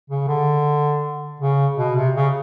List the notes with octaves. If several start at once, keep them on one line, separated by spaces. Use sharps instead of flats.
C#3
D3
C#3
B2
C3
C#3